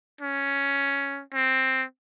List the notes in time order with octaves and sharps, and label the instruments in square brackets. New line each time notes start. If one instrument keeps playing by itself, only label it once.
[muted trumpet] C#4
C4